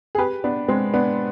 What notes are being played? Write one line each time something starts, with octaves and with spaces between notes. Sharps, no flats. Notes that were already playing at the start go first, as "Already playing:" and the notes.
G#4
G4 B4
B3 D4
G#3 C4
B3 D4